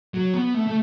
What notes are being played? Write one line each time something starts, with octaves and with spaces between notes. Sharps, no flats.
F#3
B3
A3
A3